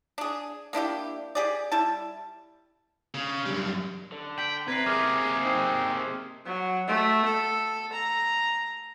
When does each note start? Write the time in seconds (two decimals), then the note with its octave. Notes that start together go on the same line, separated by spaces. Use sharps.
0.18 D4 G#4
0.73 A#3 D4 E4 G4
1.35 G4 G#4 D5
1.72 G3 E4 A5
3.14 C#3
3.46 F#2 G3
4.12 D3
4.38 G5 G6 B6 F#7
4.68 C3 B4 A#5 G#6 C7
4.86 A#3 G#4 D6 F6 B6
5.44 C4 D#4 A5 D#6 E6
6.45 F#3
6.87 A3
7.25 A4
7.92 A#5